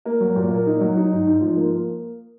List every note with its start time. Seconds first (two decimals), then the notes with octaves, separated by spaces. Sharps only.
0.05 A#3
0.21 F#3
0.36 A#2
0.51 A#3
0.66 D#4
0.81 F#3
0.97 D#4
1.12 G#2
1.27 G#2
1.41 F3
1.56 A#3
1.71 A#3